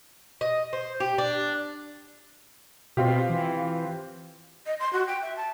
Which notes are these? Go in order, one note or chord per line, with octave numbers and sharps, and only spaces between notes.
D#5
C5
G4
D4
B2 C4 F4 G4
E3
D#5
C6
F#4
G5
E5
A5